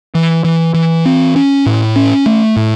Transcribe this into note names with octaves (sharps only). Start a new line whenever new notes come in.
E3
E3
E3
C4
C#4
A2
C#4
A3
A2